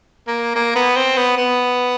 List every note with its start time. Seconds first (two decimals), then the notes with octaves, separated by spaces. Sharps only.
0.27 A#3
0.55 A#3
0.75 B3
0.96 C4
1.17 B3
1.37 B3